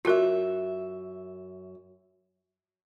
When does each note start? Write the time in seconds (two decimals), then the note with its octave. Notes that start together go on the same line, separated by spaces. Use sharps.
0.05 F#2 F4 F#4 A#4 E5